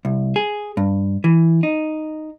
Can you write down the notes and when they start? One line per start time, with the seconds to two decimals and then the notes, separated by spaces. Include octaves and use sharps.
0.05 C2
0.36 G#4
0.77 G2
1.24 E3
1.63 D#4